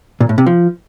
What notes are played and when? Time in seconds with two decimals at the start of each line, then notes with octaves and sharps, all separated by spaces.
0.21 A#2
0.29 A2
0.38 C3
0.46 F3